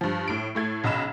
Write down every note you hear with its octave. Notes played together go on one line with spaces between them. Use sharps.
G2 F3
A2 D7
A2 A3 G#6
B1 C#3 D#5 B5 E6 E7